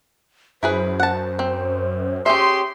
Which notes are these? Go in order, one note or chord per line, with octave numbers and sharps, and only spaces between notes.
F#2 E4 G#4 B4 C5
F#5 A5
C4
C#4 G4 G#4 E5 C6